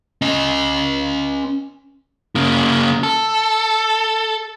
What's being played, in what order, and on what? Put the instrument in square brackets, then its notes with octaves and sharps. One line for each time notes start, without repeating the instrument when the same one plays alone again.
[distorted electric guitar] C#4 D#5
[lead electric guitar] C#3 A#3
A4